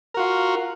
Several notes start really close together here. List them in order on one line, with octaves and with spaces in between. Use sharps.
A#4 F#4 F4